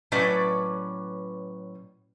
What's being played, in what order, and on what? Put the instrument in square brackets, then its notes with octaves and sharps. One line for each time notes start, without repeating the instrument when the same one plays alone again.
[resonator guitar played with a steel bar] A2 F#3 C#4 B4 D5